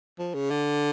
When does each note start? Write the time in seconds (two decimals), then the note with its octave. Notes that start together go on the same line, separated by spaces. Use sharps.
0.19 F3
0.34 C#3
0.51 D3